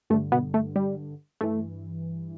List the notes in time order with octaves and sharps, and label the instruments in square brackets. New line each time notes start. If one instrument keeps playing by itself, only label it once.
[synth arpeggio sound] G2 A3
D3
B2 B3
A3
G3
G2 E3 A3